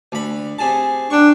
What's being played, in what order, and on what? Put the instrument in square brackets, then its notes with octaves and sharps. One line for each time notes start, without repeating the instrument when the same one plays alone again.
[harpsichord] D2 B5
C3 G#4 A5
[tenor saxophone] D4 [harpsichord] G5 C#6